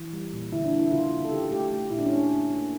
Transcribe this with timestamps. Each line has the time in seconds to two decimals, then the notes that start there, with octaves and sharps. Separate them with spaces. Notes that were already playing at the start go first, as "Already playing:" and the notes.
Already playing: E3
0.13 G3
0.33 A#2
0.53 D3 E4
0.65 D4
0.73 A#3
0.79 E4
0.92 C#3 F4
1.12 C#3
1.25 A4
1.31 C#3 G4
1.51 A3 G4
1.72 A3
1.91 A#2 E4
1.99 D4
2.06 C#4
2.10 A3 D4
2.30 A3
2.50 A#3